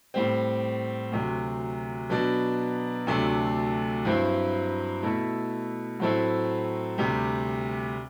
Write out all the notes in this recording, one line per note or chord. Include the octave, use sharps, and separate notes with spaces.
A2 G3 C4
D2 C3 F#3
B2 F#3 B3 D4
D2 C3 F#3 A3 D4
G2 F#3 C4 E4
B2 A3 E4
A2 F#3 A3 C4 E4
D2 C3 G3